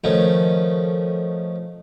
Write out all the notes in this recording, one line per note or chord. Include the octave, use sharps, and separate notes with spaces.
D#3 F3 A3 C#4